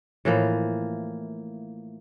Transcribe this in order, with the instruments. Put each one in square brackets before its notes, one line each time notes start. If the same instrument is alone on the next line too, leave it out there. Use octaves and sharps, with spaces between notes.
[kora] A2 E3 F3 A#3